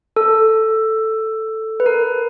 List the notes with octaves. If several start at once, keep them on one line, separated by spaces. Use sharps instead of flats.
A4
B4
A#4